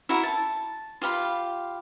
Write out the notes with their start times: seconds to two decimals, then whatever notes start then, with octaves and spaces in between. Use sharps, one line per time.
0.09 E4 F#4 A#4 A#5
0.23 A5
1.02 F4 G4 F5 B5